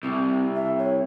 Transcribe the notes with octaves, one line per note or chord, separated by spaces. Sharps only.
C2 C4
E5
C#5